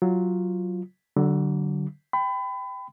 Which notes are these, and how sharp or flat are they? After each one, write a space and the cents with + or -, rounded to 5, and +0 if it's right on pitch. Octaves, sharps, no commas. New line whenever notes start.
F#3 +0 F4 +0
D3 +0 F#3 +35
G5 +0 B5 +30